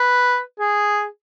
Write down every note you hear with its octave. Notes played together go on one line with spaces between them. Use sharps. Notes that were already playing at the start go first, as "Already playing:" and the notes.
Already playing: B4
G#4